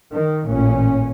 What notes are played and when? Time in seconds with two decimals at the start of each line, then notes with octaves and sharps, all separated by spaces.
0.12 D#3
0.45 A1 A#2 C#4